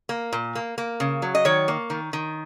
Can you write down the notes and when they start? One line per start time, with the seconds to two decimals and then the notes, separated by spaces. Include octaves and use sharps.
0.09 A#3
0.33 A#2
0.55 A#3
0.78 A#3
1.00 C#3
1.22 F#3
1.35 D#5
1.45 D#3 C#5
1.68 A#3
1.90 D#3
2.13 D#3